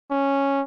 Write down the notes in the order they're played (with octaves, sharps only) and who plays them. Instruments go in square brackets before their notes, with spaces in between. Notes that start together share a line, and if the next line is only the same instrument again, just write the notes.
[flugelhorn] C#4